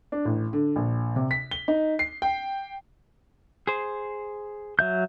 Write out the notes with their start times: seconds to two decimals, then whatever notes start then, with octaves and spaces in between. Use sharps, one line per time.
0.12 D4
0.25 A1
0.53 D3
0.76 A#1
1.16 C3
1.31 B6
1.51 G7
1.68 D#4
1.99 C7
2.22 G5
3.67 G#4 C5
4.79 F#3 E5 G6